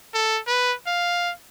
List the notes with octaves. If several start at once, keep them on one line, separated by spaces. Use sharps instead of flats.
A4
B4
F5